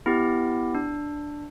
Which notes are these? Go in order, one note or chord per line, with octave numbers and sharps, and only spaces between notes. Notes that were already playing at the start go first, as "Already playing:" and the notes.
B3 E4 G4
D4